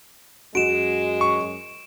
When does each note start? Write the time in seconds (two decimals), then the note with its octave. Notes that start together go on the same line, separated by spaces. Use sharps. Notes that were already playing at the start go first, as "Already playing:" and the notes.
0.55 F#2 G#3 F#4 D7 E7
1.21 C#6